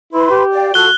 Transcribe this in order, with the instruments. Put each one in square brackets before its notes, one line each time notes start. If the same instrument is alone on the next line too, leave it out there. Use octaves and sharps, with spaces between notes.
[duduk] E4 [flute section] B4 C6
[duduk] G4
[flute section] D5 F5 G5
[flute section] F4 A4 [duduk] F#4 [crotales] F#6 G7